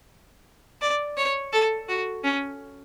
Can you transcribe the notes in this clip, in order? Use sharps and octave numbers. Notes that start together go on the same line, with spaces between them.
D5
C#5
A4
F#4
C#4